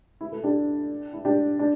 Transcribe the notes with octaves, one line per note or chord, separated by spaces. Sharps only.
E4
E4 A4
D4 G4
E4
D4 G4
D4